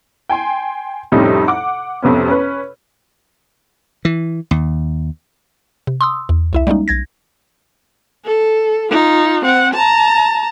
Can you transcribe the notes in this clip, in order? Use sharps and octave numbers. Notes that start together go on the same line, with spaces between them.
G5 G#5 C6
F2 A2 C3 G3 C#4 D#4
F#5 D6
F2 C3 B3 C#4
C#4 B4
E3
D#2
C3
C6 D#6 E6
E2
C2 E4 E5
G3 G#3 A#3 C#4 D#4
B1 G#6 A#6
A4
D#4 F4
C4 F#5
A5 A#5